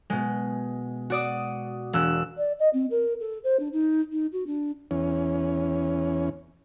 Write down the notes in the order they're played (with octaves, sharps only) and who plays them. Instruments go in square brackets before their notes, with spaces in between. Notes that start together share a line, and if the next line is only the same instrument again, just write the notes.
[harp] B2 G#3
F#4 D5 D#6
E1 E6 F#6
[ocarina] D5
D#5
C4
A#4
A4
C5
D4
D#4
D#4
F#4
D4
[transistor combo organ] E2 C#4